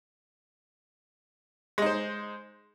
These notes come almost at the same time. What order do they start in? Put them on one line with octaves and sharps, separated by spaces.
G#3 D#4 C5